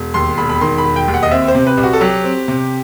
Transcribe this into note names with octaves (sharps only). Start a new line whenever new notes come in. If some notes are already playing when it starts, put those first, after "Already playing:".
Already playing: E1
D#2 C6
E1 B5
B5
D#3 C6
B5
E1
G5
D#2
F#5
D#5
C4 E5
C5
C3
B4
C2
F#4
A4
F#3 G4
C4
C3